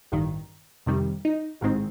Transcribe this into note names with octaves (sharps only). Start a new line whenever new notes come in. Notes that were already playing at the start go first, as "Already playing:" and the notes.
A1 G2 D#3
F2 C3 D#3 G3
D#4
A1 G#2 D#3 G#3 C4